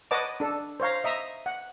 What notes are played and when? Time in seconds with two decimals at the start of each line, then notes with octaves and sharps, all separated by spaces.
0.11 B4 C#5 D#5 F#5 A5 D6
0.40 D4 A4
0.80 C5 C#5 F5 A#5
1.04 D#5 E5 A#5
1.46 F#5